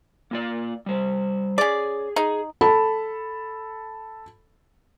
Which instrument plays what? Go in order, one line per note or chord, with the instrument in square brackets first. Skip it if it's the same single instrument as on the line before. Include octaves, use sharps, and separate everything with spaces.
[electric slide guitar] A#3 F4 D5
G3 C5
[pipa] C#4 D5 [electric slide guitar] G#4
[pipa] D#4 [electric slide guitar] G#4
[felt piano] A4 A5 B5